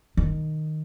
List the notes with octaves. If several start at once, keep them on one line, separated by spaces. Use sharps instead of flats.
D#3